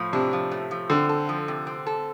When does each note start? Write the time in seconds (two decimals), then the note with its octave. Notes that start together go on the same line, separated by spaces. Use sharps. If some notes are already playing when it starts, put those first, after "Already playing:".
Already playing: A2 F3
0.13 C3 D4
0.33 F3
0.51 A3
0.71 F3
0.90 D3 C4
1.09 A4
1.29 F3
1.48 C3
1.67 C4
1.87 A4